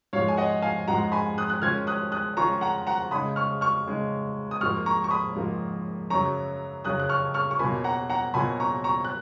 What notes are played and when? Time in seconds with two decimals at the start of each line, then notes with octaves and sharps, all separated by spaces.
0.13 G#2 F3 G#3 C#5 F5
0.28 G#5
0.37 D#5 F#5
0.62 F5 G#5
0.88 G#2 F3 G#3 F#5 A#5
1.12 G#5 B5
1.38 D#6 F#6
1.50 F#6
1.62 D#3 G#3 C#4 F4 F6 G#6
1.87 D#6 F#6
2.12 D#6 F#6
2.37 D#3 G#3 C#4 F4 A#5 C#6
2.61 F#5 A#5
2.87 F#5 A#5
3.11 C#3 G#3 D#4 B5 D#6
3.36 C#6 F6
3.61 C#6 F6
3.86 C#3 G#3 D#4
4.51 D#6
4.61 G#2 F3 A#3 C#6 F6
4.86 A#5 C#6
5.04 C#6
5.11 B5 D#6
5.35 G#2 F3 A#3
6.10 F#2 C#3 F#3 A#5 C#6
6.85 F#2 C#3 F#3 D#6 F#6
7.00 F#6
7.09 C#6 F6
7.34 C#6 F6
7.51 C#6
7.59 B2 F#3 A#3 F4 G#5 B5
7.84 F#5 A#5
8.10 F#5 A#5
8.34 B2 F#3 A#3 F4 G#5 B5
8.60 A#5 C#6
8.84 A#5 C#6
9.05 F#6